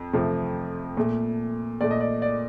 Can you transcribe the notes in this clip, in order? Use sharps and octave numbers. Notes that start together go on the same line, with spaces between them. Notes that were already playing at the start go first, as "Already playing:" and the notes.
Already playing: F2
F2 C3 F3 A3
A#2 A3
A#2 A3 D5
D#5
D5
D5